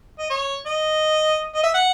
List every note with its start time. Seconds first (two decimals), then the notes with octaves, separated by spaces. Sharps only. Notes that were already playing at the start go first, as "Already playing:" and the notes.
0.19 D#5
0.30 C#5
0.66 D#5
1.55 D#5
1.64 E5
1.74 F#5